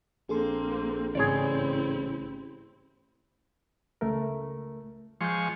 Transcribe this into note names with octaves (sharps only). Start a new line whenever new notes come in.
A#1 A#3 C4 G#4 A4 C6
A1 G#2 C#3 C4 E4 G#4 C#5 D5
C#2 A3 A#4
F3 G#3 C6 C#6 G6